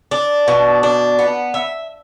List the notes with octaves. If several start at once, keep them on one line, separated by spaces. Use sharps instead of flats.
D4
B2
D4
B3
E5